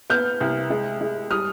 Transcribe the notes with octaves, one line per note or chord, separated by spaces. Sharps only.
B3 F6 G6
C2
G#3
G#3
G3 D#6 F6